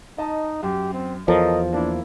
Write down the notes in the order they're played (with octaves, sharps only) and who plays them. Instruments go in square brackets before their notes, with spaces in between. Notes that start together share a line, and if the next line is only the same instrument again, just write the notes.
[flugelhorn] D#4 [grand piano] D#5 A5
[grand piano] F#2 [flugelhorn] G4
[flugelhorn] C4
[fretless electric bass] E2 F3 [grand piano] A4 A#4 C#5 [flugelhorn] D#5
[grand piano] A#3 E4 [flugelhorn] D4